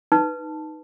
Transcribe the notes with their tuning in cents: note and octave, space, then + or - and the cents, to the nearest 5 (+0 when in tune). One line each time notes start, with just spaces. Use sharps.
D#4 +0 B4 +0 A5 +0